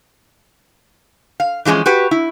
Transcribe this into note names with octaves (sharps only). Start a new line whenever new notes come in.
F5
E3 F3 G#3 C4 C#4
F#4 G4 B4
E4